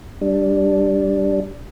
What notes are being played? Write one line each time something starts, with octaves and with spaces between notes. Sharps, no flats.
G3 D4